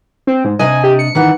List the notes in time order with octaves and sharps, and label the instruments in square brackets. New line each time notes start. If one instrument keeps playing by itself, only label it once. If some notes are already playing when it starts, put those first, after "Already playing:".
[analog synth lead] C4
G#2
[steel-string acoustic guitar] C3 D4 D#5 [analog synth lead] G#5
[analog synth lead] G4
C#7
[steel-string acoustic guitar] D#3 E3 F#5